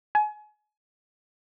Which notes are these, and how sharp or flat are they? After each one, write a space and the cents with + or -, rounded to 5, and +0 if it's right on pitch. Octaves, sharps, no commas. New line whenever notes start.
G#5 +25